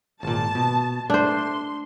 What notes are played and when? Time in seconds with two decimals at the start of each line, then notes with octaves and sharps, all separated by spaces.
0.23 G#1 A#2 A5
0.55 B2
1.10 A3 D4 C5 C6